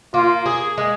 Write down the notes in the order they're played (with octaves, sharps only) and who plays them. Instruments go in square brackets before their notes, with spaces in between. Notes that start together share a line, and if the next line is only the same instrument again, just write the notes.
[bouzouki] A#3 [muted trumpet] F4
[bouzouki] G#4
G#3